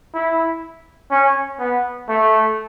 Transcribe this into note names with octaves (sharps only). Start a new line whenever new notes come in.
E4
C#4
B3
A3